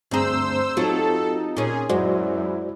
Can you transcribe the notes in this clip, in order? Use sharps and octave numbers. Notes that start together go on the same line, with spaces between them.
D2 G2 C4 G#4 C5 A#5 E6
F#3 C4 D#4 F4 G4 A4
A#2 C#4 G#4
F#2 G#3 E4 F#4 C5 D5